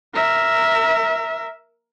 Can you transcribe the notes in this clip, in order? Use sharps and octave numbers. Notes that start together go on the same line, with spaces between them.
A#4 E5